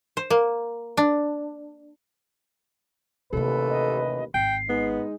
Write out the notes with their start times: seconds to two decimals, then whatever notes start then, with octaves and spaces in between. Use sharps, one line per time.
0.17 C5
0.30 A#3
0.97 D4
3.33 A1 D#2 C3 A#3 A4 B4
3.69 D#5
4.34 G#1 G5 C7
4.69 G#3 B3 D#4